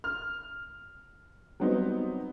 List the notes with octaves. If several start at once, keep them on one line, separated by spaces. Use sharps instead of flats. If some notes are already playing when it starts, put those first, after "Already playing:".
F6
F#3 G3 B3 C4 D#4